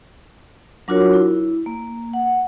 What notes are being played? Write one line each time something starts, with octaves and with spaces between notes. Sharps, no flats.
F#3 D4 F4 F#4 A#4 C#5
E4
A#3
F#5